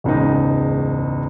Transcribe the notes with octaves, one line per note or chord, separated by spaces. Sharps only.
E1 C#2 G#2 D#4